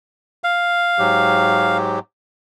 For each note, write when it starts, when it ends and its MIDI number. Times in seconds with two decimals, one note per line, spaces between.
0.44 1.77 77
0.99 1.99 44
0.99 1.99 54
0.99 1.99 67